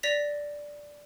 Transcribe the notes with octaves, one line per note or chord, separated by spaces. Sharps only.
D5 A#6 B6 F7